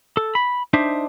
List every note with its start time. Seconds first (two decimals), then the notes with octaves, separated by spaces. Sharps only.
0.17 A4
0.35 B5
0.73 D4 D#4 C5 E5